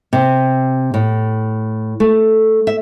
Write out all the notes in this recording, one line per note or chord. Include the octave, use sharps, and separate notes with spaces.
C3
A2
A3
E5